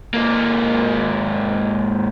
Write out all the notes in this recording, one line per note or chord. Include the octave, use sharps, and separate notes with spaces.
G#2 A#3